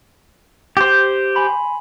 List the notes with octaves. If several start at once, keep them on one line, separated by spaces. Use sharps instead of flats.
G4 C5
G#5 B5 C6